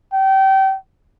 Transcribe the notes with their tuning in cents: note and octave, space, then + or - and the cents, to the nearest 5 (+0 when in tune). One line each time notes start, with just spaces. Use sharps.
G5 -30